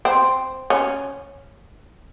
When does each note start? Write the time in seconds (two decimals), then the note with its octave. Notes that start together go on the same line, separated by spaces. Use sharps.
0.05 C4
0.70 C#4